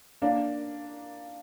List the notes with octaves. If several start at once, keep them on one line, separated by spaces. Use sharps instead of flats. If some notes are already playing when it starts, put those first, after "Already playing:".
A#3 D4